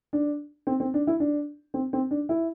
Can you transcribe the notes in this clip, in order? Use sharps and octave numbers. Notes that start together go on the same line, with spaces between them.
D4
C4
C4
D4
E4
D4
C4
C4
D4
E4